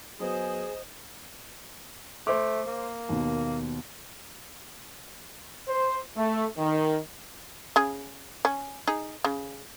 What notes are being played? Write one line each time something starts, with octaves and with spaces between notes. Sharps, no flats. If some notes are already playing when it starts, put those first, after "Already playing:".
F#3 B3 G#4 C5 D#5
A3 C5 D6
A#3
D#2 B2
C5
A3
D#3
C#3 G#4
C#4
D#4 G#4
C#3